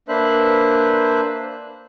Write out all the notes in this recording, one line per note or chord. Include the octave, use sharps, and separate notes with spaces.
A#3 D4 B4 C5 E5 F#6